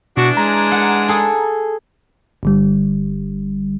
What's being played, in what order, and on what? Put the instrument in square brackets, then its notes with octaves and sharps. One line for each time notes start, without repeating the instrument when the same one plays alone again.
[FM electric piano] B2 [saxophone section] E3 D4 [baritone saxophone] F#4
[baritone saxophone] G#3 [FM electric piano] A#5
[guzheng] F#5
G#4 A4
[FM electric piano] G1 D3 G3